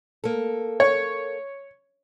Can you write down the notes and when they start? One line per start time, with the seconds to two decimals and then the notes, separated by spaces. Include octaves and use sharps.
0.24 A#3 A4
0.80 C#5